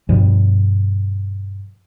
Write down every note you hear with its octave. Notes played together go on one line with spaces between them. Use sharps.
G2 B2 F3 G3